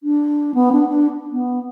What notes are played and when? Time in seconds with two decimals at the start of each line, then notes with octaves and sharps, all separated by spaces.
0.03 D4
0.54 B3
0.72 D4
0.89 D4
1.32 B3